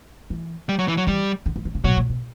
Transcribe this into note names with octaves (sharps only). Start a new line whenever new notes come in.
E3
G3
F#3
E3
F#3
E3 G3
D3
E3
D3
C#3
B2 F#3
A#2
B2